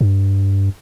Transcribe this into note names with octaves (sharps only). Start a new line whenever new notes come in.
G2